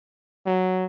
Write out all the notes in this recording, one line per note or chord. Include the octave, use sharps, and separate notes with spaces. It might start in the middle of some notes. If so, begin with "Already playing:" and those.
F#3